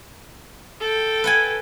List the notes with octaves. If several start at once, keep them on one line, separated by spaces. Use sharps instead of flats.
A4 G5
B4 F#5 G#5